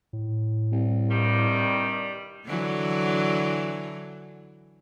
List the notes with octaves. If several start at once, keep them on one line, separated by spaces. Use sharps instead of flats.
A2
C2
G2 D#3 G3
D3 E3 F#3